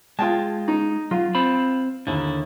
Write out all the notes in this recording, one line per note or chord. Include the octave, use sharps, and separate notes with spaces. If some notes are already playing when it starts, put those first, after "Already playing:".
G#3 F4 G5 A5
D#4
F#3 F4
C4 C5 B5
D#2 D3 D#4 E4